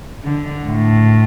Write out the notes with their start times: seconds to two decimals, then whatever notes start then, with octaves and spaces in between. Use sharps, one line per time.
0.24 D3
0.66 A2